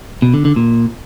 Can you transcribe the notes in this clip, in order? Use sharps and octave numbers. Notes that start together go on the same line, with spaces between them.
B2
D3
D3
A#2